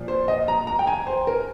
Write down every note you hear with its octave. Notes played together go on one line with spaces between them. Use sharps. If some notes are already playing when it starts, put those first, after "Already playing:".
Already playing: A#2 F3
C5
D#5
A#5
A#5
G5
G#5
C5
A#4